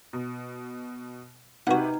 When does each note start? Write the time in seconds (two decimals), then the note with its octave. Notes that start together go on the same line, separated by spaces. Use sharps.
0.13 B2
1.67 C3 D#4 F#4 B4 F#5